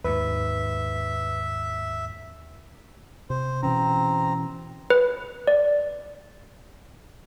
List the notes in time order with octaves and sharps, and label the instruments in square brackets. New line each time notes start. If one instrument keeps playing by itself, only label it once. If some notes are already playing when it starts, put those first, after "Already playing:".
[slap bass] D#2 G#2 [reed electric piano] B4 [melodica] E5
[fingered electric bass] C3 [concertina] C5
[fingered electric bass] B2 E3 C#4 [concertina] C4 A#5
[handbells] B4
D5